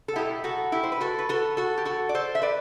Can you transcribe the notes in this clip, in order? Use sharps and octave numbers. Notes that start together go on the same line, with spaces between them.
A4
B2 F#3 B3 E4 G4
F#4 A4
E4 G4
C5
B4
F#4 A4
B4
F#4 A4
F#4 A4
G4
F#4 A4
D5
A4 C5
E5
B4 D5